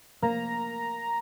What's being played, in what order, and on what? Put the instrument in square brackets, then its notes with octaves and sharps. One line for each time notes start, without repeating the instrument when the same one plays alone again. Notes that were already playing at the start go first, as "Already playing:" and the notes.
[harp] A#3 [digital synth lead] A#5